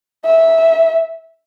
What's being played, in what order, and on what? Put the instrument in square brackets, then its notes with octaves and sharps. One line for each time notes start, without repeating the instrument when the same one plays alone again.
[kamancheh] E5